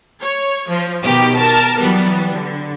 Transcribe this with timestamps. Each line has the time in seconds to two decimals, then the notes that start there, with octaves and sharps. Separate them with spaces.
0.22 C#5
0.69 F3
1.03 B2 D#3 G4
1.38 A#4 A5
1.79 E3 F#3 G3 B3
2.33 D3